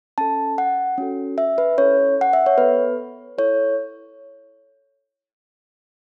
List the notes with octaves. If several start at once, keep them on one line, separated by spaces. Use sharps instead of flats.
C#4 A4 A5
F#5
C#4 F#4 A4
E5
B4
C#4 E4 A4 C#5
F#5
E5
C#5
B3 A4 B4
E4 A4 C#5